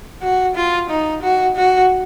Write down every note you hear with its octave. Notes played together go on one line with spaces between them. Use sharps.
F#4
F4
D#4
F#4
F#4